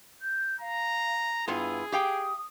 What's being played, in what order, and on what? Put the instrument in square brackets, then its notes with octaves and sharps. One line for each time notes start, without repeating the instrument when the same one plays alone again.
[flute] G6
[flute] F5 [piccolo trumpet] A#5
[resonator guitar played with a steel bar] G2 B3 F4 [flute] E4 [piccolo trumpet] G#4
[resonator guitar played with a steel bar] G4 F5 G5 [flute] D#6